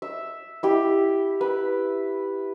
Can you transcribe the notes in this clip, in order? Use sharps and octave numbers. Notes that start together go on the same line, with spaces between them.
E5
E4 G4
B4